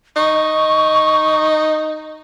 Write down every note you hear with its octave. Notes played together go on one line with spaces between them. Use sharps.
D#4 C#6